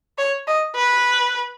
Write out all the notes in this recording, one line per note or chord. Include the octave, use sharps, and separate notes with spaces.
C#5
D#5
B4